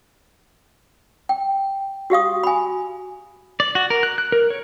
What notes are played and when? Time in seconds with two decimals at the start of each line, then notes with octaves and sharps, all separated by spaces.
1.29 G5
2.10 F#4 G4 F5 D#6
2.43 G#5 B5
3.60 D5
3.75 F#4
3.90 A#4
4.03 F#6
4.18 F#6
4.32 A#4
4.50 C#5